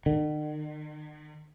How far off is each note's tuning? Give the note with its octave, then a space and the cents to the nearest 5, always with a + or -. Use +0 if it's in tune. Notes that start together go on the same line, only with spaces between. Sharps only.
D#3 -45